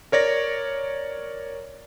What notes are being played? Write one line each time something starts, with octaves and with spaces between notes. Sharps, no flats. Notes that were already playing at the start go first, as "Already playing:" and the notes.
A#4 C#5 D5 A#6